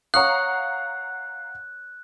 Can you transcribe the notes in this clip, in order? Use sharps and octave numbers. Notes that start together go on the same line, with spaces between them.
C#5 F5 F#5 A#5 C#6 D#6 F#6